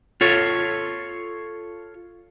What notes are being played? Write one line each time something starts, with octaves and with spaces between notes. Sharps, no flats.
F4 A4 C#5